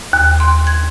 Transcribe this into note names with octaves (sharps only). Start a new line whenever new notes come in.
D#2
C6
G#6